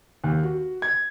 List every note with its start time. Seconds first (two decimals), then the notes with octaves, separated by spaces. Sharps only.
0.24 D#2
0.43 F#4
0.82 G#6